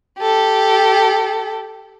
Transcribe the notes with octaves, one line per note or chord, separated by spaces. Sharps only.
G4 A4